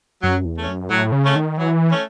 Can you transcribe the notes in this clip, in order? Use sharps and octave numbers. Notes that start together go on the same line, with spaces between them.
F#2 F#3
E2
A3 C#4
F#2
A2 F#3
C#3
A3 C#4
D#3
E3 F#3
A3 C#4